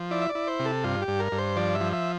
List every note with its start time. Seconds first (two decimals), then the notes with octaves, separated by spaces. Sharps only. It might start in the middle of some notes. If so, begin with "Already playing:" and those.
Already playing: F3
0.11 E4 D5
0.22 E5
0.29 D5
0.35 E4
0.47 C5
0.59 C3
0.65 A4
0.84 G2 F4
1.02 G4
1.08 G2
1.20 A#4
1.32 G2
1.38 C5
1.57 F3 D5
1.75 E5
1.81 F3
1.93 E5